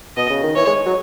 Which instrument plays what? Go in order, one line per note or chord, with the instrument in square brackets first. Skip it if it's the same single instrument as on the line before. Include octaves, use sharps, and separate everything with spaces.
[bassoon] B2 [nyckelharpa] D#5
[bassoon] C#3
D#3
[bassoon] E3 [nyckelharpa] C#5
[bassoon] G#3
F#3